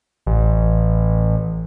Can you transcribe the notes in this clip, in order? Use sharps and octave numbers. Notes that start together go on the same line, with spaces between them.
A1